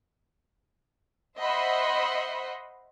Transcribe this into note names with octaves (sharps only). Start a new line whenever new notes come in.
C5 D#5 E5 F#5 B5 C6